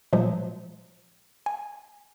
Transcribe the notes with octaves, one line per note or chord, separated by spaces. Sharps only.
A#2 F3 F#3 G#3
G#5